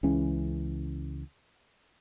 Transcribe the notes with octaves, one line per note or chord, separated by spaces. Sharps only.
C#2 C#3 E3 C#4